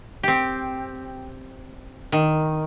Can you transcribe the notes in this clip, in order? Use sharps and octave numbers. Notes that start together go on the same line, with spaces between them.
C4 G4
D#3